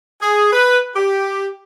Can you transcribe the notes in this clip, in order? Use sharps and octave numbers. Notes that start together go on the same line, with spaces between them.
G#4
B4
G4